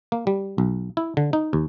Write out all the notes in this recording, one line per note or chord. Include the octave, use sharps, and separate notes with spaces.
A#3
G3
B1
E4
D3
D#4
D#2